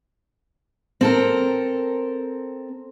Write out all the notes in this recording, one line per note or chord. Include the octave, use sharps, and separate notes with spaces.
C4 A4 A#4